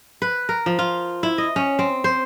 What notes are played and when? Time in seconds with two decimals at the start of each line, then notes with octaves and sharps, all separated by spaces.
0.22 B4
0.49 A#4
0.66 F3
0.79 F4
1.23 E4
1.38 D#5
1.56 C#4
1.79 C4
2.04 C5